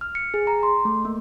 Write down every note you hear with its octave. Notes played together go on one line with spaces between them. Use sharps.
F6
C#7
G#4
A#5
C6
A3
A#3